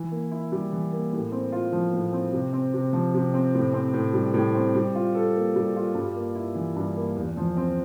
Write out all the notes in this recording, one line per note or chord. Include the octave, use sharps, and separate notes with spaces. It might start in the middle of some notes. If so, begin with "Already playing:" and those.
Already playing: E3
A#3
E4
G3
E3
A#3
A2
C4
F4
F3
A2
C4
C3
C4
C3
F3
C3
C4
A2
C4
A2
G3
A2
C4
G3
F4
A4
A#3
G3
F4
G2
A#3
E4
E3
G2
A#3
E2
F3
C4